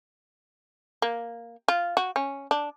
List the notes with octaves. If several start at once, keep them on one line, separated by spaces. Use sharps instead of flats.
A#3
F4
F#4
C#4
D4